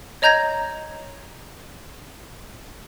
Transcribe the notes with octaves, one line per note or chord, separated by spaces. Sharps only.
C#5 D#5 A#5 G6 G#6 A#6